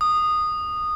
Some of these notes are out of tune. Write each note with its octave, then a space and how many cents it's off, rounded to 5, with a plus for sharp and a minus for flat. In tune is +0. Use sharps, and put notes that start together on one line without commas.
D#6 -15